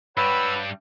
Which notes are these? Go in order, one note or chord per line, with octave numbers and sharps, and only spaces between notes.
G2 G3 B4 C#5 F#5 B5 E6